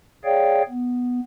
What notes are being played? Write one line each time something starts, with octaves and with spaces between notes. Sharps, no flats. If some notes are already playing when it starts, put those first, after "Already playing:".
G#4 C#5 D5 F5 G5
B3